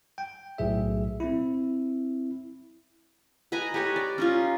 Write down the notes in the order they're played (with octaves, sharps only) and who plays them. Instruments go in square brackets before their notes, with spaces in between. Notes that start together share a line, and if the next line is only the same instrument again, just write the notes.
[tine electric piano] G5
B1 A2 G#4 E5
C4 E4
[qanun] B4 D#5 G#5 A#5
G4 B4 C#5 D#5
D5
C#4 D#4 F4